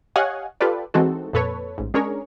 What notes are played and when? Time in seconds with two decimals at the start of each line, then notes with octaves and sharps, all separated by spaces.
0.16 G4 C#5 D#5 F5 F#5 G#5
0.61 F4 G4 A4 B4 D5
0.94 E3 G#3 C4 D#4 F#4 A4
1.33 F2 A#2 A4 B4 C#5
1.78 A1 G#2
1.94 G#3 C#4 D4 G#4 A#4 C#5